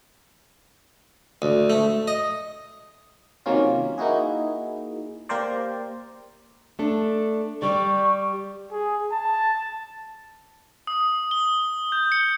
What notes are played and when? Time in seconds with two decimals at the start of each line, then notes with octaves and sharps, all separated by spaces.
1.42 D2
1.70 A3
2.08 D#5
3.46 C3 D#3 F#3 A#3 C#4 F4
3.98 A#3 D#4 E4 F#4 G#4
5.29 A#3 G4 A#4 C5 D5
6.79 A3 D4 A4
7.62 G3 G4 D5 C#6
8.71 G#4
9.12 A5
10.87 D#6
11.31 G7
11.92 G6
12.12 C#7